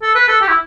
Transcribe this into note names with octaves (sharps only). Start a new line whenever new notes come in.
A4
B4
A4
G4
E4